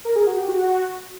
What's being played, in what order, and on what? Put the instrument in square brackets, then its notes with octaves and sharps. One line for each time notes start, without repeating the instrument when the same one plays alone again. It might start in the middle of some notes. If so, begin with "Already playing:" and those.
[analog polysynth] A#4
G#4
F#4
G4
F#4